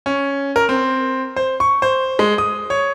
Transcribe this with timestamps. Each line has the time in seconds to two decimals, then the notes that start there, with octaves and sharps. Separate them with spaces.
0.06 C#4
0.56 A#4
0.69 C4
1.36 C5
1.60 C#6
1.82 C5
2.19 G#3
2.38 D#6
2.70 C#5